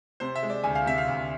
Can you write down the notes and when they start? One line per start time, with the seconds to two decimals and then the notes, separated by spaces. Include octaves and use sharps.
0.20 C3 C5
0.36 E5
0.43 G#3
0.50 D5
0.64 D2 G#5
0.75 F5
0.86 C3 E5
0.98 F5
1.08 D2